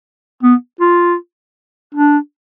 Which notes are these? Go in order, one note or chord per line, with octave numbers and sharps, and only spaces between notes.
B3
F4
D4